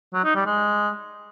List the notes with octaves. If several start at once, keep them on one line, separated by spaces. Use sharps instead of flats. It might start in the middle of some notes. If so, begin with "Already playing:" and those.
F#3
D#4
G3
G#3